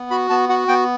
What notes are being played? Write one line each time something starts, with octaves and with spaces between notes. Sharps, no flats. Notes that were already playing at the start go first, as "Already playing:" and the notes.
Already playing: B3
F#4 B5
B3 A5
F#4 F#5
B3 G5